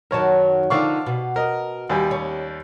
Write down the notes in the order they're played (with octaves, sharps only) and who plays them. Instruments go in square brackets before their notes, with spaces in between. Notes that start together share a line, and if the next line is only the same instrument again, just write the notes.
[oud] F#2 D#3 F#3 [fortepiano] A#4 C#5 A5
[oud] D3 D#3 F3 [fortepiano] D5 F5 C#6
[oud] B2
[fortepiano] A#4 D#5
D#2 G3 G#5
[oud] C#4